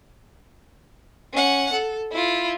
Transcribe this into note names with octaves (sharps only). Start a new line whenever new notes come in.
C#4 F#5
A4
E4 F4